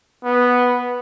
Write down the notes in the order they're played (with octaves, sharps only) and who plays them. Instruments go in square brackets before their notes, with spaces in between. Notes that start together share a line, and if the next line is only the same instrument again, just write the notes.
[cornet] B3